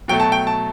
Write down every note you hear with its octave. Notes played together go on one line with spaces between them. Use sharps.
B2 F#3 A3 G5
A5
G5
A5